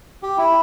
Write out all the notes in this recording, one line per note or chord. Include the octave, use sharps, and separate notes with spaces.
G4
E4